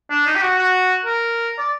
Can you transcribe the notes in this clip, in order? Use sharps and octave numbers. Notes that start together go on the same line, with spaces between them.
D4
D#4
G4
F#4
F#4
A#4
D5